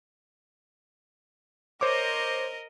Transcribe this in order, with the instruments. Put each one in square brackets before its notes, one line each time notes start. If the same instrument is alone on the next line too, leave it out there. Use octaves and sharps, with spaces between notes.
[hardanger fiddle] A#4 D#5 [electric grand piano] C5 C#5 D6